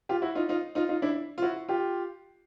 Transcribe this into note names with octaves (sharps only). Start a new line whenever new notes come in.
F4 G4
E4 F#4
D#4 F4
D#4 F4
D#4 F4
D#4 F4
D4 E4
F4
E4 F#4
F4 G4